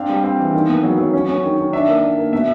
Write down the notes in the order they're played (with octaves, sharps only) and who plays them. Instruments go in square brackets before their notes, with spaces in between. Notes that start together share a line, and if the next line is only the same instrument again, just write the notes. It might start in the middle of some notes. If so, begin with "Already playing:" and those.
Already playing: [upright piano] C4 D4 F5
G3
C4
E3
D#3
B3
F#3
F#3
C#4
C#4
D#3
D#3
D4 E5
A#3
D4
A#3
B2 E5